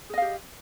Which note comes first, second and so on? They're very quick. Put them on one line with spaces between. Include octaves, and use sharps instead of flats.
G#4 D#5 F5 G4